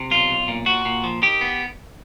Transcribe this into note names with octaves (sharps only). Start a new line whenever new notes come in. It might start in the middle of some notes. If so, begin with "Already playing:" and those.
Already playing: C3
B1 F4
B1
A#2
A#2 F#4
A#2
F3
D#3 G4
B3